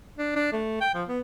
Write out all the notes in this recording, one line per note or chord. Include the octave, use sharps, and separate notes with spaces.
D4
D4
A3
G5
F3
B3